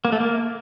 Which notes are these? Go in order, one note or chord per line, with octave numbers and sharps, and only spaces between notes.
A#3
A3
A#3